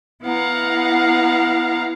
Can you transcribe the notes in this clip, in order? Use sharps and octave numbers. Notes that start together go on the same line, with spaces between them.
B3 E4 F5 F#5 A#5